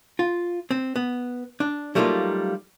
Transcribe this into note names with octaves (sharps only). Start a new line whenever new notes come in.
F4
C4
B3
D4
F#3 G3 A3 A#3 D#4 F4